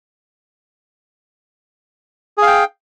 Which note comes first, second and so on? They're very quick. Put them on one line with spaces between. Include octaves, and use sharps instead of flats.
G#4 F5 G5